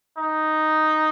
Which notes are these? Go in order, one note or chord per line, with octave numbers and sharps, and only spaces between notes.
D#4